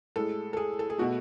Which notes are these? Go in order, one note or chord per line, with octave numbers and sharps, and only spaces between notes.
A2 G#3 A4
A4
G#4
A4
G#4
B2 A3 F#4